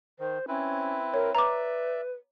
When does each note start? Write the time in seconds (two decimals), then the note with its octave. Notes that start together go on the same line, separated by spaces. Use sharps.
0.19 D#3 C5
0.48 C4 C#4 E4 B4
1.14 A#4 C#5
1.35 B4 D5 E5 A#5 D6